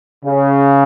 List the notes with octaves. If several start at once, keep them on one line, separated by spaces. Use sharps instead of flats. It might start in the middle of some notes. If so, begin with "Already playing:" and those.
C#3